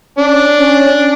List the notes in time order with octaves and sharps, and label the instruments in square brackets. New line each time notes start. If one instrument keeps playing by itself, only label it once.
[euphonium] C#4 [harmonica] D4
[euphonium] C#4